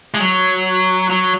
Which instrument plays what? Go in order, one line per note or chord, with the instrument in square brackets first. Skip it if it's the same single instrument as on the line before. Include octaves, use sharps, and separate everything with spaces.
[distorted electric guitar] G#3
F#3
F#3